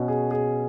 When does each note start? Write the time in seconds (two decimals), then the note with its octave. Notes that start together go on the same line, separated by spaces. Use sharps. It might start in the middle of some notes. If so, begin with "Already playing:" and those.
Already playing: B2 C#4
0.08 G#4
0.31 G#4